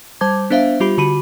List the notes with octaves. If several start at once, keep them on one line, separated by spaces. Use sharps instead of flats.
G3 C5 A5 D6 G#6
B3 D4 C5 E5 F5
G3 F4 G4 B5
D3 F#4 B5 D#7